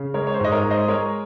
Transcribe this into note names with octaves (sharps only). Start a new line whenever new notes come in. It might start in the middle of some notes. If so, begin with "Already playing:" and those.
Already playing: C#3
G#3 A#4 C#5
C#5
C5
G#2 D#5
A#4 C#5
G#3
C5 D#5
G#3 A#4 C#5